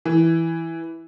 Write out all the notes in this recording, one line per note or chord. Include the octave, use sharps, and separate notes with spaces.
E3